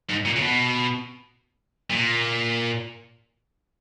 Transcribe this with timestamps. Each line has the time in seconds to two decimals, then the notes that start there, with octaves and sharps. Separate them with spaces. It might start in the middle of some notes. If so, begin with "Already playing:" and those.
0.09 G#2
0.25 A#2
0.36 C#3
0.41 B2
1.91 A#2